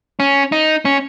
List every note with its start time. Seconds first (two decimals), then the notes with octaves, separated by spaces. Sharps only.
0.20 C#4
0.52 D#4
0.85 C#4